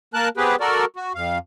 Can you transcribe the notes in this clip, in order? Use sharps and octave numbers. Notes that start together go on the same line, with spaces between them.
A#3 A#4 A5 F#6
B3 C4 G4 G#4 B4
F#4 A4 A#4 D5
F#4
F2 F5